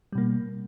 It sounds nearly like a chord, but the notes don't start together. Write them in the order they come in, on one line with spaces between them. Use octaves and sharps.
G3 B2 A#3